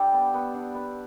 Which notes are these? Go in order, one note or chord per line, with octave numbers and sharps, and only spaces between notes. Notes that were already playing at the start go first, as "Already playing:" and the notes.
Already playing: G3 D4 G4 A4
B3
B3
D4
B3